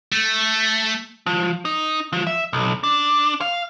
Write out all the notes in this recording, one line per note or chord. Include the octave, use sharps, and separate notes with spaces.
A3
F3
D#4
F3
E5
B1
D4
F5